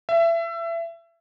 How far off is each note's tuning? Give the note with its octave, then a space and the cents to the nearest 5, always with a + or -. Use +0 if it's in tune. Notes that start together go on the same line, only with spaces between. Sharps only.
E5 +25